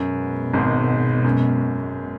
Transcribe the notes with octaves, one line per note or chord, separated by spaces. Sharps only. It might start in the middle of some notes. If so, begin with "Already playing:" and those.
Already playing: F#2 B2 G#3 B3
G#1 G#2
F#2